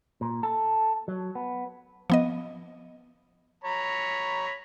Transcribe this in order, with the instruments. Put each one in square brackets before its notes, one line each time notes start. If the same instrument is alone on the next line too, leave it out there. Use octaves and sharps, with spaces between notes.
[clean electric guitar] A#2
A4
F#3
B3
[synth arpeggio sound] F3 B3 D#5
[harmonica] C#5 A#5 B5